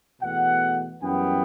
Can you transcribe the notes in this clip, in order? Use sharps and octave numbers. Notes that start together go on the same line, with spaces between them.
E2 B2 A3 F#5
F#2 E3 G3 B3 G5